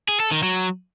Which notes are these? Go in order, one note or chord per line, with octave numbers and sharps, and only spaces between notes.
G#4
A4
D#3
F#3